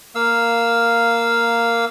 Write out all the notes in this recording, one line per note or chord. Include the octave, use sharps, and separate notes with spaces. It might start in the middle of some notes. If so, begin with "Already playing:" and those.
A#3 F5 E6